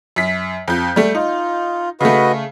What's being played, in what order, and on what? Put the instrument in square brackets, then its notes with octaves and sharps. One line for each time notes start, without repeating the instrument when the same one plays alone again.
[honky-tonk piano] F#2 B6
F2 G6
G3 A3
[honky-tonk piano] D#4 [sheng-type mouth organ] F4
[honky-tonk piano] C#3 A3 [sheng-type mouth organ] F#4 B4 D#5